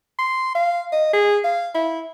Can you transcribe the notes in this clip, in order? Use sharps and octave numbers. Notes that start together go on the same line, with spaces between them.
C6
F5
D#5
G#4
F5
E4